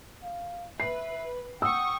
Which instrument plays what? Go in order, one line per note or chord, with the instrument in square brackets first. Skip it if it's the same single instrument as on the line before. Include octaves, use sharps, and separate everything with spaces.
[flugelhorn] F5
[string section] B4 [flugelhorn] E5 [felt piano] C7
[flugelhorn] F#5 [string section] G5 C#6 [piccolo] D#6 [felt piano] E6